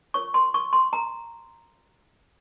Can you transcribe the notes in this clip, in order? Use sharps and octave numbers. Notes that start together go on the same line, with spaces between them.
F4 A#4 C#5 C#6
C6
C#6
C6
A#5